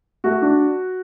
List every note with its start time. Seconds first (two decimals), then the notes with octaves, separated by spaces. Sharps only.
0.24 A3 F#4
0.42 D4